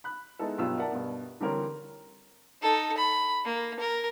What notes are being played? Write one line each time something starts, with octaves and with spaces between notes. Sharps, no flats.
B5 F#6
G#3 B3 D#4 E4 A4
G2 B2 F#3 F4 G4 E6
A#4 D5 E5 F#5 A5
G2 B2
D3 E3 G3 C4 A#4 C#5
D#4 A4
B5
A#3
A#4